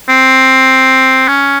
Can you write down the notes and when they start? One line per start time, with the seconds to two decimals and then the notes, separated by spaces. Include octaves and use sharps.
0.09 C4
1.28 C#4